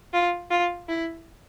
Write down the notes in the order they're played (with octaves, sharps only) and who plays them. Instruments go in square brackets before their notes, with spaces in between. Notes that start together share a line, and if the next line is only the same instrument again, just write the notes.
[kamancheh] F4
F4
E4